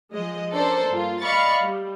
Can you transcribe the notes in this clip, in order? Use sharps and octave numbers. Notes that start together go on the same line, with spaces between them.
F3 G#3 D#5
C#4 D4 A4 A#4 C5 D5
G2 A#3 F4
D5 D#5 F5 B5 C#6 A6
G3